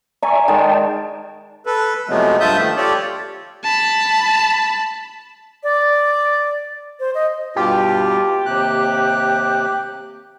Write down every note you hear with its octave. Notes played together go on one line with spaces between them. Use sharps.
D5 E5 G#5 A#5 C#6
D#3 G#3 D5 G5 A5
A4 B4
C3 F3 F#3 G#3 A3 B3
G2 F4 E5 A5 D#6 G6
D#3 F3 A3 A#3
F4 G4 A4 C#5 D5
A5 B5
D5
C5
D#5
G2 B2 F4 G4
D#2 C3 F#6